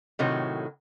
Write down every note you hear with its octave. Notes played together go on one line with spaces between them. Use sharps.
A2 C3 D#3 F#3